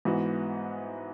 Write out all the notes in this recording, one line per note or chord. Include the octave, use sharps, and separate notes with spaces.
G#2 E3 B3 F#4